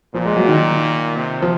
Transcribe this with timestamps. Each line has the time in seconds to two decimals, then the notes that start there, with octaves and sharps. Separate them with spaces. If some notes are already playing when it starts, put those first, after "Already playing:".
0.14 A#2 F3
0.26 G#3
0.37 F#3
0.48 D#3
1.16 C3
1.42 F3